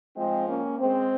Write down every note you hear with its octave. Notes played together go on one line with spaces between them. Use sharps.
G#2 F3 G#3 C4
A#3 C#4
G#3 C4